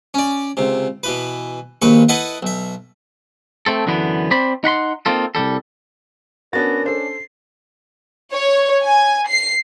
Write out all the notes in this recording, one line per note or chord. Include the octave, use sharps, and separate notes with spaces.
C#4 D5
C#2 C3
B2 E3 B4
A#1 D#2 A#2 B4 C#6
E4 A4 B4 D#5 E5 F#5
B1 E5
A3 C4 A4
F#2 D3 E3 B3
C4 C5 D5 B5
D#4 F#5 B5 C6
A#3 C4 D#4 F4 A4
C2 G#2 G3 A4
B3 C#4 D4 F#4 A#4 A6 A#6
A4 C5 C7
C#5
G#5
C7